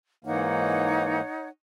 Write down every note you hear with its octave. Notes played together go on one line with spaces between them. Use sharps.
G#2 E3 A#3 D#4 C#5 F#5